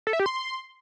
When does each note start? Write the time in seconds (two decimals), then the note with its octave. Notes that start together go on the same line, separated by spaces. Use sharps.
0.07 A4
0.13 E5
0.20 G4
0.26 C6